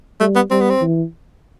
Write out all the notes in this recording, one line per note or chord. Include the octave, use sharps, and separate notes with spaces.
G3 A3
B3
G3 C4
B3
C4
E3